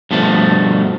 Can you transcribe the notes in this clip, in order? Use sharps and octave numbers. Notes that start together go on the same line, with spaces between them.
G2 B2 F3 A3